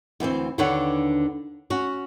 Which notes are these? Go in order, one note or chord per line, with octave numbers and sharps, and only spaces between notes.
D2 E3 C4 C5
D#2 D3 D4 B4 C#5 F#5
C#4 F#4